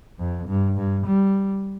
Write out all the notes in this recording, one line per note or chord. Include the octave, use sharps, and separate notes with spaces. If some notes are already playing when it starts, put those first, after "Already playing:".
F2
G2
G2
G3